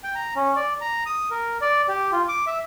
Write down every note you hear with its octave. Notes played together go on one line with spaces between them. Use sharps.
G5
A#5
C#4
D5
A#5
D#6
A#4
D5
G4
F4
D6
E5